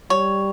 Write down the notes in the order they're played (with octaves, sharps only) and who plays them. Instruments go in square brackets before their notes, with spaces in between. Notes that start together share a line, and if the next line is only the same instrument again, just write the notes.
[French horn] G3 [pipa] C#5